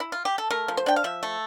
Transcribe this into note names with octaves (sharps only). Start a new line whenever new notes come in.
E4
F4
G4
A4
A3 A#4
F3
C5
D4 G5
F5
F3 E5
A3